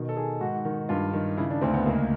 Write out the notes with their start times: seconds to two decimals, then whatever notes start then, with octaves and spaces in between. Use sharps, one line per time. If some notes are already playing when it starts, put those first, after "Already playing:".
Already playing: B2 D#3
0.09 A4
0.17 D#3 G#4
0.41 G#2 F#4
0.65 D#3
0.89 G2 F4
1.13 D#3
1.37 C#3 E4
1.50 D4
1.61 D2 C4
1.74 B3
1.86 C#2 A#3